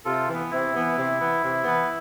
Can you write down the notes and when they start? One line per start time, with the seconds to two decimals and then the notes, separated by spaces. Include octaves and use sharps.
0.05 C3 F4 A4
0.28 E3 B3
0.51 C3 E4
0.74 E3 B3
0.97 C3
1.20 E3 B3
1.42 C3
1.64 E3 B3